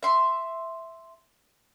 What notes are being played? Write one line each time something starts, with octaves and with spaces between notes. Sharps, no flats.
E5 C6